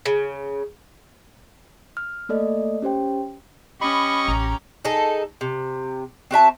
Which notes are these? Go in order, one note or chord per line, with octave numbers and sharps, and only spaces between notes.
C#3
F6
A3 A#3 A4 D5 D#5
C#4 G4 C5 G5
C#4 G4 D#5 B5 C#6
A1 A#5
D#4 G#4 A4
C3
C4 F#4 E5 A5